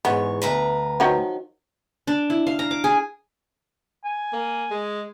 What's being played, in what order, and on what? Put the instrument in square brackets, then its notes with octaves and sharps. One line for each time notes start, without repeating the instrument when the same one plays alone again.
[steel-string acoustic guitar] E2 G#2 C#5 [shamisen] B3
[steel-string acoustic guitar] D2 B4 A#5
[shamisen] D#3 F3 F#3
[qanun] D4
E4
F5
A#5
D6
G#4
[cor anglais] G#5
[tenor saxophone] A#3
G#3